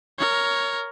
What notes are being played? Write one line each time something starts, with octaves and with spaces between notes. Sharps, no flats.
A#4 C#5